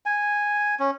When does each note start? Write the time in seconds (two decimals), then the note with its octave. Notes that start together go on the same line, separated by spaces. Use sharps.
0.06 G#5
0.80 C#4